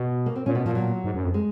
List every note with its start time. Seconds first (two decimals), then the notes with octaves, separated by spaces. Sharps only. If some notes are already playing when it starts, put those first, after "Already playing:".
Already playing: B2
0.26 A#3
0.36 C4
0.46 A#2 C#4
0.55 B2 B3
0.66 A#2 F3
0.75 F#3
1.04 G#2
1.15 F#2
1.24 F2
1.34 G#3